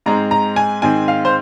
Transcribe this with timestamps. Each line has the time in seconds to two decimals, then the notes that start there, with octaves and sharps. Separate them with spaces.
0.06 G#2 G#3 C4 A#5
0.31 A#5
0.56 G#5
0.82 G#2 D#3 G#3 C4 G#5
1.08 F5
1.25 C5